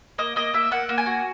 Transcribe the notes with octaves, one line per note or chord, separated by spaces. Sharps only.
A#3 D#5
A#3 D#5
A#3 E5
A#3 F#5
A#3
G#5
F#4